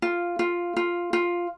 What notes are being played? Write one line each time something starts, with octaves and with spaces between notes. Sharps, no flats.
F4
F4
F4
F4